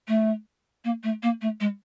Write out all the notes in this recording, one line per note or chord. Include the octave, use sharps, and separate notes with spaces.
A3
A#3
A3
A#3
A3
G#3